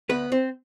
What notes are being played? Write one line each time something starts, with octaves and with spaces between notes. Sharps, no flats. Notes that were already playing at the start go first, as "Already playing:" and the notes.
D2 B3 B4
C4 C5